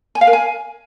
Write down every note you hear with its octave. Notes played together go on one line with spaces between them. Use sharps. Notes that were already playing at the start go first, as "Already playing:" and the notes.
G#5
F5
A#4
G#5